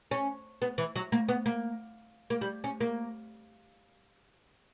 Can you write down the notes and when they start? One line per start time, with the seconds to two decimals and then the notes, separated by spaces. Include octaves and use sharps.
0.11 C#4
0.62 B3
0.78 E3
0.96 F#3
1.12 A#3
1.29 B3
1.46 A#3
2.30 A#3
2.41 G3
2.64 C#4
2.81 A#3